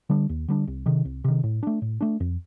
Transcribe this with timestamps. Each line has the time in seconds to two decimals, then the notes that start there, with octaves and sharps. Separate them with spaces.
0.10 D3 G3 D4
0.29 D#2
0.48 D3 G3 D4
0.68 C2
0.86 C3 D#3
1.05 C2
1.24 C3 D#3
1.44 A2
1.63 A3 D4
1.82 A2
2.01 A3 D4
2.20 F2